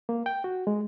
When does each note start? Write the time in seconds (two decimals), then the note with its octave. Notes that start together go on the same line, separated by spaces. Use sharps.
0.09 A#3
0.26 G5
0.44 F#4
0.67 G#3